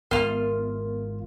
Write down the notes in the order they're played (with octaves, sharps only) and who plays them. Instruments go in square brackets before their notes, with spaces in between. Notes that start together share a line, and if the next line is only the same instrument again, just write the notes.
[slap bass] G#1 [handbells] B3 A#4 [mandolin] F4 F6